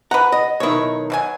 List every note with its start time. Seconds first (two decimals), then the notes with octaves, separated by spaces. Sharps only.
0.11 B4 F#5 A#5
0.32 D#5
0.60 B1 D#3 E4 C#5
1.10 B2 F#3 G#5